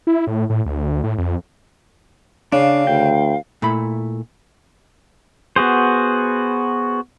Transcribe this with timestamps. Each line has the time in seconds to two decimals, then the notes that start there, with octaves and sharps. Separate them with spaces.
0.07 E4
0.27 A2
0.50 A2
0.66 D2
1.04 A2
1.18 F2
2.52 C#3 D4 F5
2.87 D2 G5
3.62 A#2 A3 E4 B5
5.56 B3 F#4 G#4 C5